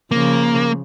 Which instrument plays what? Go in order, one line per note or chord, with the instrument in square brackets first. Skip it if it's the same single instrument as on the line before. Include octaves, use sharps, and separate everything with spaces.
[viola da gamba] C#3 F3 [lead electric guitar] A#3